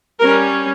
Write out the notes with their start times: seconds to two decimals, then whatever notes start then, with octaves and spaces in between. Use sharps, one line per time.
0.19 G3 C#4 A#4